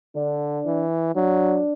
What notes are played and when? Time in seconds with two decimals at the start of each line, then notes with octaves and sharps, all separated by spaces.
0.15 D3 D4
0.65 E3
1.15 F#3 D4